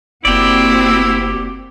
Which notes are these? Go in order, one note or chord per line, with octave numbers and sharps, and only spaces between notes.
F#1 A#3 C4 E4 F#4 G4 D5